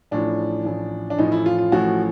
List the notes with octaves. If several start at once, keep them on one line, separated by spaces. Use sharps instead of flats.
A1 A2 F3 D4
A1 A2 F3
D4
A1 A2 F3 D#4
E4
F4
F4
A1 A2 F3 F#4